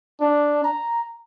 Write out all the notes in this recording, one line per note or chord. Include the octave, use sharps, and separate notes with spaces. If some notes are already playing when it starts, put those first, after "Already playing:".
D4
A#5